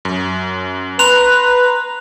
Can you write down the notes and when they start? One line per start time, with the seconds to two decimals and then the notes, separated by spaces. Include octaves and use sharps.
0.05 F#2
0.99 B4 A#5 C6 F#6 F7